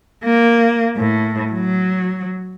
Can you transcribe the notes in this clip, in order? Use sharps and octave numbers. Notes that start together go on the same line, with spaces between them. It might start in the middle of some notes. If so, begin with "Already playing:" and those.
A#3
A2
F#3